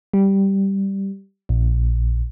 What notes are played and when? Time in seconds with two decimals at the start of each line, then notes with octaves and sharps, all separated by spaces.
0.14 G3
1.49 A#1